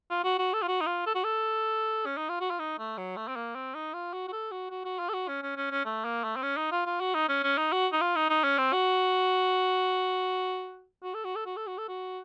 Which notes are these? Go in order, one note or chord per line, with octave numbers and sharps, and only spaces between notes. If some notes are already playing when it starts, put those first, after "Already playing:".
F4
F#4
F#4
A4
F4
F#4
D#4
F4
A4
F#4
A4
C#4
D#4
F4
F#4
F4
D#4
A3
F#3
A3
C4
A#3
C4
D#4
F4
F#4
F#4
A4
F#4
F#4
F#4
F4
A4
F#4
C#4
C#4
C#4
C#4
A3
A#3
A3
C4
C#4
D#4
F4
F4
F#4
D#4
C#4
C#4
D#4
F#4
D#4
F4
D#4
D#4
C#4
C4
F#4
F#4
A4
F#4
A4
F#4
A4
F#4
A4
F#4